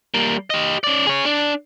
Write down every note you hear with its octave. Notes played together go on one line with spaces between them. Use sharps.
G3 A#3
G4 D#5
C#4 D5
G#4 C#5
D4